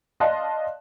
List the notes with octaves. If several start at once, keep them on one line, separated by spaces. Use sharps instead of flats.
D5 D#5 F5 A5 C6 F#6